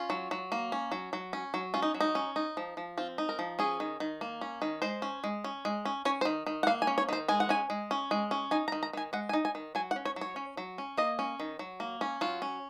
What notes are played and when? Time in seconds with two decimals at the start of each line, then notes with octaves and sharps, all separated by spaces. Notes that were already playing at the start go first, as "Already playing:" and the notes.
Already playing: C#4 F4
0.10 F#3
0.31 F#3
0.52 A#3
0.72 C#4
0.92 F#3
1.13 F#3
1.33 C#4
1.54 F#3
1.74 C#4 F4
1.82 D#4
1.94 F#3
2.01 D#4
2.15 C#4
2.36 D#4
2.57 F3
2.77 F3
2.98 C4 F4
3.18 D#4
3.29 A#4
3.39 F3
3.59 C#4 G#4
3.80 D#3
4.00 D#3
4.21 A#3
4.41 C#4
4.62 D#3
4.82 G#3 C5
5.02 C#4
5.24 G#3
5.44 C#4
5.65 G#3
5.85 C#4
6.05 C#4 C#5
6.21 C5
6.25 D#3
6.47 D#3
6.63 F#5
6.67 A#3 F5
6.82 G#5
6.87 C#4
6.98 C#5
7.09 D#3 C5
7.28 G#3 G#5
7.40 F#5
7.49 C#4 G#5
7.70 G#3
7.91 C#4
8.11 G#3
8.31 C#4
8.51 D#4 G#5
8.68 A#5
8.72 D#3
8.83 A#5
8.93 D#3 G#5
9.13 G#3 F#5
9.29 G#5
9.33 D#4
9.45 G#5
9.55 D#3
9.75 F#3 G#5
9.91 F#5
9.96 C#4
10.05 C#5
10.16 F#3
10.21 C#5
10.36 C#4
10.57 F#3
10.78 C#4
10.97 A#3 D#5
11.19 C#4
11.40 D#3
11.59 F#3
11.80 A#3
12.01 C#4
12.21 F#3 F4
12.42 C#4